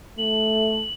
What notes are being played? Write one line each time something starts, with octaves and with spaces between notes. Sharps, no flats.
A3 F#7